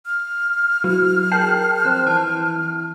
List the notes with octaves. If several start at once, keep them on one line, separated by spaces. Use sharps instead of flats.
F6
F#3 E4 F#4
G#4 A#4 G5 A5 G6 C7
F2 C5 F#6
E3 A5